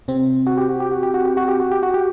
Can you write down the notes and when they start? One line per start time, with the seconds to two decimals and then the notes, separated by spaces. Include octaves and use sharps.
0.08 C3 C4
0.47 F#4
0.58 G4
0.69 F#4
0.80 G4
0.92 F#4
1.03 G4
1.14 F#4
1.26 G4
1.37 F#4
1.48 G4
1.60 F#4
1.71 G4
1.83 F#4
1.94 G4